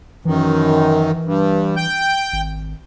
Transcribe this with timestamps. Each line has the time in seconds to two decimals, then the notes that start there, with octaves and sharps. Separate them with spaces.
0.25 F#2 D#3 E3
1.25 G2
1.77 G5 G6
2.33 G#1